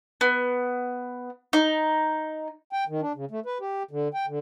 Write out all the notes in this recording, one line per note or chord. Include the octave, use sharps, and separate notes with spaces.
B3
D#4
G5
D#3
D4
C#3
A3
B4
G4
D3
G5
D3